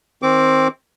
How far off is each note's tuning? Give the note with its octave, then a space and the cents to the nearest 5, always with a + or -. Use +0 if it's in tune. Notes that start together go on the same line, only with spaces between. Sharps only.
D#3 +30 C4 +10 D6 -20